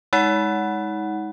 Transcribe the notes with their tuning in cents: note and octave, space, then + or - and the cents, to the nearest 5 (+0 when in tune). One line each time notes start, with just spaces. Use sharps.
G#3 +0 D#4 +35 F#5 +0